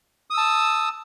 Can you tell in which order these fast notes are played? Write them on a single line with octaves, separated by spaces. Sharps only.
D#6 E6 A5